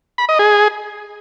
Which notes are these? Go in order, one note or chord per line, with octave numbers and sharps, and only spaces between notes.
B5
D#5
G#4